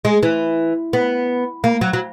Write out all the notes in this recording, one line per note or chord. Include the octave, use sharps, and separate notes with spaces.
G#3
E3
B3
A#3
F#3
F#3